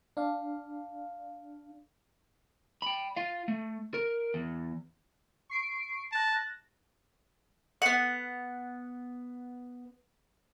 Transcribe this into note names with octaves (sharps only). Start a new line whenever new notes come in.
D4 F5
G5 B5
F4 F5
A3
A#4
E2
C#6 C7 D7
A5 F#6 A6 A#6
B3 F#5